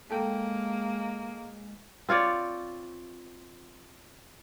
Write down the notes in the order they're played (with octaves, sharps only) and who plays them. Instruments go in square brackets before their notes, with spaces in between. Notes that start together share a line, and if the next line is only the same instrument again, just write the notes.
[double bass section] G#3 [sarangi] A#3 [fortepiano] A4 G5
[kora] C4 F4 C#5 D5